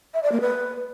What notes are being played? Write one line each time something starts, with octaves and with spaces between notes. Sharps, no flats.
E5
D5
A#3
B4